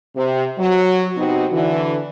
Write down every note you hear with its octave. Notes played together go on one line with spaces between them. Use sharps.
C3
F#3
C3 B3 C4 D#4 F#4
D3 E3